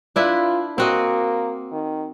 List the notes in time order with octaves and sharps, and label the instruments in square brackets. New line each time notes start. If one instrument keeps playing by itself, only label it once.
[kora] D4 E4 B4 [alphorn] F4
[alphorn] A#3 [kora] C4 F#4 D#5
[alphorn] D#3